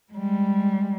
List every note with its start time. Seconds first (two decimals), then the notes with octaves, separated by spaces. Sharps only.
0.13 G3 G#3